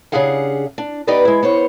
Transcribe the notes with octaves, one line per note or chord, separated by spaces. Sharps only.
C#3 D4 G4 G#4 F5 F#5
D4
B3 D#4 G4 B4 D5 D#5
G#3 E4
B3 C5 C#5